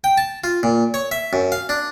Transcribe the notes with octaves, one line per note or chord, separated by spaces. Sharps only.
G5
A5
F4
A#2
C#5
E5
F#2
F5
D4